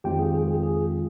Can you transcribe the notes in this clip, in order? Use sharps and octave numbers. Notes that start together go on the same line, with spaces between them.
F2 D#3 G#3 C4 F4 G4 G5
G#4
G#4
G#4
G#4